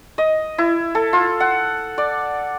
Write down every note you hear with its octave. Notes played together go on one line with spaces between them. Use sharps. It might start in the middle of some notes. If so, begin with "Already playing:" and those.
D#5
E4
A4
F4
F#5
D5